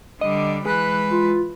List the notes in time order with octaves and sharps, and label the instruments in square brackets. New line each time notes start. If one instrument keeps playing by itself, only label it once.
[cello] D3 G3 [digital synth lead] D#5
[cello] E3 B4 [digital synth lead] G#3 [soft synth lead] F#6
[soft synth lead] F4